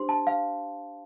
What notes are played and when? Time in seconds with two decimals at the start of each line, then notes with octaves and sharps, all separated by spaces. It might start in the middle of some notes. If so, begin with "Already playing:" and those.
Already playing: D4 G4 C5 C6
0.09 A5
0.27 F5